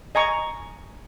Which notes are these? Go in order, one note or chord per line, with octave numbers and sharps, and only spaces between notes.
D#5 G#5 A#5 C#6